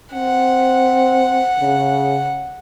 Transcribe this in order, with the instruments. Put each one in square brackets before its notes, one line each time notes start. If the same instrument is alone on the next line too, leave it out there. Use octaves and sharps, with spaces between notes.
[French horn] C4 [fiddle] F#5
[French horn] C#3